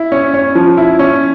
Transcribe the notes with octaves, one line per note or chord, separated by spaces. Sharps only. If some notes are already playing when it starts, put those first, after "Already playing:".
Already playing: E4
C#4
C#4
F3
E4
C#4